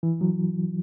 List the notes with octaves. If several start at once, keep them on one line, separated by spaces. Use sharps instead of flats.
E3
F#3